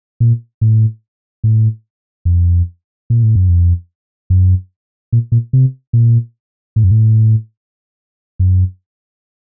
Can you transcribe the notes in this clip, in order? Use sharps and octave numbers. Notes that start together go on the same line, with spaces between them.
A#2
A2
A2
F2
A#2
A2
F#2
F2
F#2
A#2
A#2
C3
A#2
A2
F#2
A2
F#2